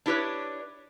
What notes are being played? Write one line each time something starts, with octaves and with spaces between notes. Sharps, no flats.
D4 E4 G4 A#4 B4 C#5